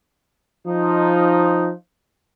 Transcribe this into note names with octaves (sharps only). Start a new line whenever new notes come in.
F3 D#4